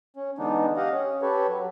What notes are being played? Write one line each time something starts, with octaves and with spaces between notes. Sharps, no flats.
C#4
D3 E3 G#3 B3 D4 D#4
G4 D#5 F5 F#5
C#4
G4 A4 B4 C#5
F#3